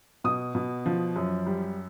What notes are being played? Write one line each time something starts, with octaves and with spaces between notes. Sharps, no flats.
B2 D#6
B2
F3
F#2
G3